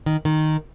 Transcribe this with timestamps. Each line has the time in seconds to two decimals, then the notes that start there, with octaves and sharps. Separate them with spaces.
0.06 D#3
0.25 D#3